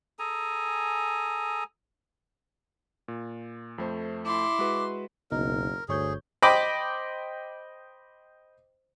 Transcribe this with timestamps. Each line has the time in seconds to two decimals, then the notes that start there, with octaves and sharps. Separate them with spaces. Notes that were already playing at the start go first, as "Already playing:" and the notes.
0.19 G#4 A4 G#5 A#5
3.08 A#2
3.78 F2 A3 C5
4.26 E4 C6 D6
4.59 G#3 F#4 B4
5.31 F#1 C#2 B2 D#4 A#4
5.88 G1 D2 G#4 C#5 G6
6.42 C5 D#5 G5 B5 D6